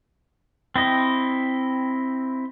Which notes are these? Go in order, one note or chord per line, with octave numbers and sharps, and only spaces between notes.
C4 E4 D#5